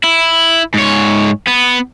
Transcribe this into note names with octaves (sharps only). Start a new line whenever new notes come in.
E4
G#2 C#5
B3